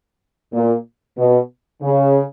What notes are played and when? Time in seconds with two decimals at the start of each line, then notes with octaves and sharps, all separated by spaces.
0.53 A#2
1.18 B2
1.83 C#3